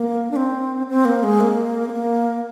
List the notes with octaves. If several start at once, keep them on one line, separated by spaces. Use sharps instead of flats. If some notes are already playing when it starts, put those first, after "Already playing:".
Already playing: A#3
D4
C4
C4
A#3
G#3
A#3
C4
A#3